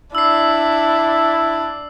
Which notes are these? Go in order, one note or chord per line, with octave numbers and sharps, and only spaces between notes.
D4 E4 E6 C7